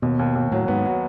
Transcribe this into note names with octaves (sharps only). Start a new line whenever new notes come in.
D#2 B2
D#2
D#2
A2 F#3
G#2 B3
F#3